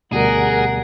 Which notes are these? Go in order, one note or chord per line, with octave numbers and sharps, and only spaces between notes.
D2 B2 G3 G#4 A#4 F#5